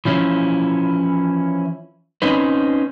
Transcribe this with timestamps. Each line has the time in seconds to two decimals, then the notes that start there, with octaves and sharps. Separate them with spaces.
0.05 E3 F3 C#4 E4
2.22 C4 C#4 D#4 B4